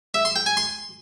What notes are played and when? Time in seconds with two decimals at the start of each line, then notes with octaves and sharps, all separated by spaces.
0.14 E5
0.25 C6
0.36 G5
0.46 G#5
0.57 C6